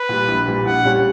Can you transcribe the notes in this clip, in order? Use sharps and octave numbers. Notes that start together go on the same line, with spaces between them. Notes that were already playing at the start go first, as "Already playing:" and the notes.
Already playing: B4
A#2 G3
A#1
A#2 G3
A#1 F#5
A#2 G3 C#4 G4